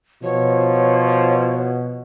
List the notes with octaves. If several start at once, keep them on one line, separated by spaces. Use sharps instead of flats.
B2 F3 C#5